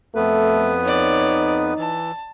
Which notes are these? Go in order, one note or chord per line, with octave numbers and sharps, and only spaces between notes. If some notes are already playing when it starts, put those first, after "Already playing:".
F2 A3 B3 B4
D#4 C#5 D5
E3 A5